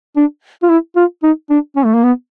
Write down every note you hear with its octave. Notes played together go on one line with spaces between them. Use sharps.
D4
F4
E4
F4
D#4
D4
C#4
A3
A#3
B3